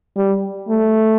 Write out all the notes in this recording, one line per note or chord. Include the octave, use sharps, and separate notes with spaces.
G3
A3